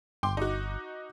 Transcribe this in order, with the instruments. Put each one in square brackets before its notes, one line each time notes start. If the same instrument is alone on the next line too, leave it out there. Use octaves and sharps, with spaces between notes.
[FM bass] G1 [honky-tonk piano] G5 C6 D6
[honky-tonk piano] D#4 F#4